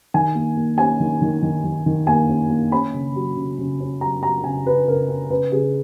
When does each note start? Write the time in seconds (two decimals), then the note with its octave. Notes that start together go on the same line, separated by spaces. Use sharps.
0.14 D#3 G#5
0.35 A#3
0.56 A#3
0.78 C#4 G#5
1.00 D#3
1.22 D#3
1.42 D#3
1.64 D#3
1.86 D#3
2.07 A#3 G#5
2.29 C#4
2.50 A#3
2.72 C#4 B5
2.94 C#3
3.16 F#3
3.37 C#3
3.59 C#3
3.80 C#4
4.01 F#3 A#5
4.23 F#3 A#5
4.44 C#3 G#5
4.65 C#3 B4
4.88 C#3 A#4
5.09 C#4
5.30 C#3 B4
5.52 C#3 G#4